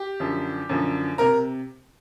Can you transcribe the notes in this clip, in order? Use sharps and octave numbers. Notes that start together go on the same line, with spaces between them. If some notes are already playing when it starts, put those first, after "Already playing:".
Already playing: G4
F#2 D3 F3
F#2 D3 F3
C3 A#4 A#5